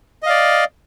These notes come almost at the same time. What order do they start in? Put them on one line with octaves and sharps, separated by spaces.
D#5 F5 D5